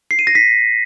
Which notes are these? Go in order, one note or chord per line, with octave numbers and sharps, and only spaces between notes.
C7
D#7
A#6
B6